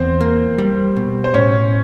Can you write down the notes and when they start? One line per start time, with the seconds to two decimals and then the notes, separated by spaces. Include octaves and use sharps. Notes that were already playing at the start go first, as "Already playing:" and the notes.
Already playing: E2 C4 C5
0.21 A#3
0.58 G3
0.97 B2
1.24 C5
1.34 A2 C#4 C#5